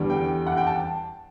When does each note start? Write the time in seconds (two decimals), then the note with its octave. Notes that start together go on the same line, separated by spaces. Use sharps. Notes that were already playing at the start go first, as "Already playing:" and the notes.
Already playing: E2 D3 G3
0.10 G5
0.47 F#5
0.57 G5
0.67 A5